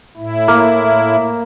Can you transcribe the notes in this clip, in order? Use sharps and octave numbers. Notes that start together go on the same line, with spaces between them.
A2 E4
A#3